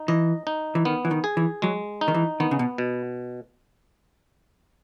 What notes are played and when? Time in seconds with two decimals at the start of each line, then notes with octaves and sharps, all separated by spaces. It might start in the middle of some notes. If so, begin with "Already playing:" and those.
Already playing: D#4
0.08 E3 D#5
0.47 D#4
0.75 E3
0.85 D#3 B3
1.05 E3
1.11 D#3
1.24 G#4
1.37 E3
1.62 F#3 G#3
2.01 D#4
2.08 D#3
2.14 E3
2.40 D#3 B3
2.51 C#3
2.59 B2
2.78 B2